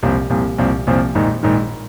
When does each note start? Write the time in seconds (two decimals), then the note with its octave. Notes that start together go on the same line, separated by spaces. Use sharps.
0.03 C2 A#2 F3 C4
0.30 C2 A#2 F3 C4
0.58 C2 A#2 F3 C4
0.87 C2 A#2 F3 C4
1.15 A#1 G#2 D#3
1.43 A#1 G#2 D#3